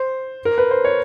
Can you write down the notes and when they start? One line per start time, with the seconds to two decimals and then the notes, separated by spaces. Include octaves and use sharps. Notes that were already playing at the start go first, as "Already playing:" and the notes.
Already playing: C5
0.45 A#4
0.58 B4
0.71 C5
0.85 C#5